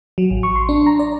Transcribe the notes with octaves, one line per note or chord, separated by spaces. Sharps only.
F#3
A1
C#6
C6
D4
A#5
D5